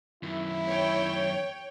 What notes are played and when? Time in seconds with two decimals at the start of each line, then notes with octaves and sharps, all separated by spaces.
0.23 F#2 D#3 E4
0.68 C#5 G5